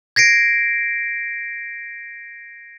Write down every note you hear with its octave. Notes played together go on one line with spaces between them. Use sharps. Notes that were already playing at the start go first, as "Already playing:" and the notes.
G#6 A#6 C7 D7